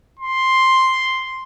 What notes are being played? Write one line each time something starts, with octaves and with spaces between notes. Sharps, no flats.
C6